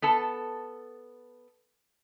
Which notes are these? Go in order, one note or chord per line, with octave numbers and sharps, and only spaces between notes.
B3 A4 A5